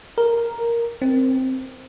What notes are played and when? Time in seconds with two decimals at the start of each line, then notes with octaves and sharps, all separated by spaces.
0.18 A#4
1.02 C4